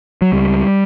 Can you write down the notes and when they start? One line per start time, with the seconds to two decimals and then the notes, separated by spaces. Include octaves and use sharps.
0.22 F#3
0.32 C#2 G3